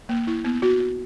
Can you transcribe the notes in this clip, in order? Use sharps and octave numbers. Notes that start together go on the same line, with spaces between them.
A#3
E4
B3
F#4
F#4